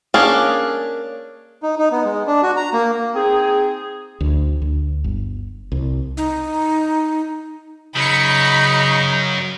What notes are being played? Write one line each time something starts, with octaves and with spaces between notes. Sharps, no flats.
A#3 C#4 D4 G#4
D#4
D#4
B3
G#3
D4
F#4
A#5
A#3
C4 D#4 G#4
D2
D2
G1
C2
D#4
F#2 C#3 F#3 D#4 B5 B6 C#7